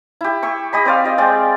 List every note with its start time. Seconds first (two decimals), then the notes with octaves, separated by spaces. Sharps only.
0.21 E4 G4
0.43 G4 E5 C#6
0.73 G4 D#5 B5
0.85 C4 C5 D5 F5
1.04 F4 D#5
1.18 G#3 C4 D5 G5